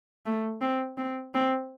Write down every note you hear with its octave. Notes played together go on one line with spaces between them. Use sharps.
A3
C4
C4
C4